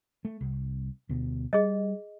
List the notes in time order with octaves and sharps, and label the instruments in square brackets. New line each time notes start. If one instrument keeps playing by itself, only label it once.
[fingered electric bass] A3
C2
D2 B2
[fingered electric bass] G3 [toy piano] G#4 D#5